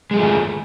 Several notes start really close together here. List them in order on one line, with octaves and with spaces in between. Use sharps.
G#3 G#4 A3 F4 D#3